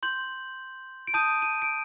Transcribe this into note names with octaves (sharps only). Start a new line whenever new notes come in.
C6 G6 F#7
D7
A5 D#6 G6 D#7
D#7
D7